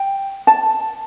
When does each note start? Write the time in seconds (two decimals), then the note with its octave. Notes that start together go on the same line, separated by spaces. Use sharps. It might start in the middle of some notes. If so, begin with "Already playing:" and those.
Already playing: G5
0.47 A5